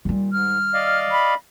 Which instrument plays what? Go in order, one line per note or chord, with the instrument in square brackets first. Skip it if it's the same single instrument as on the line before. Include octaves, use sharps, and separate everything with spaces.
[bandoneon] A#2 [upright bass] D#3 G3
[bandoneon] G#2 [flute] F6
[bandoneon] D5 D#5 F5
[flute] B5